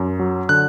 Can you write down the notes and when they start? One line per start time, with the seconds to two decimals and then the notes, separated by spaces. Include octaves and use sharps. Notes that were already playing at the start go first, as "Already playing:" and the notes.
Already playing: F#2
0.19 F#3
0.49 D3 F#6